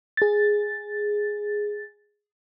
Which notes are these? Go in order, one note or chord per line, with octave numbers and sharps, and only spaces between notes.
G#4 A6